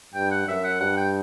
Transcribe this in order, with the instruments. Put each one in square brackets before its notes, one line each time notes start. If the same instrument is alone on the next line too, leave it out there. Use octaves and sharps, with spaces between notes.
[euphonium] G2 [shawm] G5
[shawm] F#5
[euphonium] F#2 [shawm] E5
[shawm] F#5
[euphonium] G2 [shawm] F#5
[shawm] G5